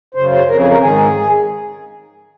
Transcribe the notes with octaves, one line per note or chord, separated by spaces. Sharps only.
F#2 C#3 C5
C5
F2 C#3 A#4
G#4
A#4
G#2 D#3 G#4